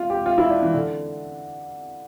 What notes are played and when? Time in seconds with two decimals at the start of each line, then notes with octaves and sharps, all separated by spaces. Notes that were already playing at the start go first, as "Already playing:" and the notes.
Already playing: F4
0.10 G4
0.26 F4
0.38 E4
0.50 D4
0.62 E3
0.74 D3